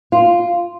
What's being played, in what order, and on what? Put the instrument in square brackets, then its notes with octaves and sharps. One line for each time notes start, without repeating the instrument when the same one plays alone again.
[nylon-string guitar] F4